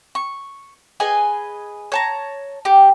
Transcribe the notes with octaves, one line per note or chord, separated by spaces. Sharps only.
C#6
G#4 B4 D#5 G#5
C#5 A5 A#5
G4